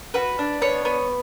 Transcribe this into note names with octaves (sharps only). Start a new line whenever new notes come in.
F#4 B4
D4
B3 C#5
B3